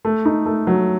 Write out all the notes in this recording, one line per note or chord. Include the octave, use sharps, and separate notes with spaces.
A3
D#4
A3
F#3